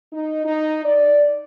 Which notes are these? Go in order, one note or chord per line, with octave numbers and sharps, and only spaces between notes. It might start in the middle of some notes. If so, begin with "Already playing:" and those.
D#4
D#4
D5